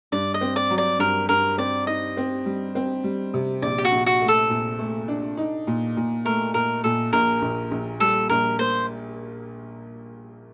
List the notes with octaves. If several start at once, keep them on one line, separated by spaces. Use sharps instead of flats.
G2 D5
D#5
C4
D5
F#3
D5
G2 A#4
G2 A#4
C4 D5
D#4 D#5
C4
G3
C4
G3
C3
A#1 D5
G4
F#4
A#1
F#4
A3
A4
A#2
A3
D4
D#4
A#2
A#2
A3 A#4
A#2 A#4
A#2 A4
A#1 A#4
A#1
A#1
G3 A4
A#1 A#4
A#3 C5